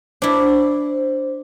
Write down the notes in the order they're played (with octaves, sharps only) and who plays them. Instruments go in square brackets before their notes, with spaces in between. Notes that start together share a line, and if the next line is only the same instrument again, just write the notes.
[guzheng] D4 E4 [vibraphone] C5